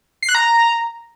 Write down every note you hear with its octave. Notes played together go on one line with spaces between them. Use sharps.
C7
F#6
A#5